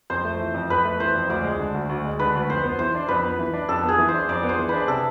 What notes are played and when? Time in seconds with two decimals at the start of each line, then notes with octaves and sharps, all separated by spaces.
0.10 F2 C5
0.25 A3
0.40 E3
0.54 F2
0.70 F2 B4
0.85 A3
1.00 E3 C5
1.15 F2
1.29 D2 D5
1.44 G#3
1.60 D3
1.74 D2
1.89 D2
2.05 G#3
2.19 D3 B4
2.35 D2
2.50 F2 C5
2.64 B3
2.79 E3 C5
2.95 D4
3.08 F2 B4
3.24 B3
3.39 E3
3.54 D4
3.69 F2 A4
3.84 B3 G#4
3.98 E3
4.08 C5
4.14 D4
4.29 F2 D5
4.43 B3
4.49 C5
4.59 E3
4.69 D4 B4
4.88 C3 A4